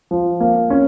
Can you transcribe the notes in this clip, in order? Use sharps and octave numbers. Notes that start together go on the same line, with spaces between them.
F3
A#3
C#4